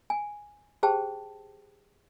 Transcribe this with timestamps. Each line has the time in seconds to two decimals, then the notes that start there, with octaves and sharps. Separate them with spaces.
0.10 G#5
0.83 G4 G#4 C5 G5 A5